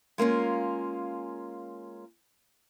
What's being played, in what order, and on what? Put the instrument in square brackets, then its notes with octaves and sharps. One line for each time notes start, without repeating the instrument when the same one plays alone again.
[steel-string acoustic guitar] G#3 A#3 C#4 F4